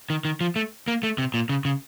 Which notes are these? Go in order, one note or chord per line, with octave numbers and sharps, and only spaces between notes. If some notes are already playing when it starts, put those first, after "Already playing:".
D#3
D#3
F3
A3
A#3
A3
C3
A#2
C#3
C#3